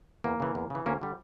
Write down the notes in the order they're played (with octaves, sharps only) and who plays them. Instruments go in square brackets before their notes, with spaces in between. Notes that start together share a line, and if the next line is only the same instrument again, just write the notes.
[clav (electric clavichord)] E2 A#3
C#3 E3
E2
C#3 E3
D2 A#3 C#4
D3 G3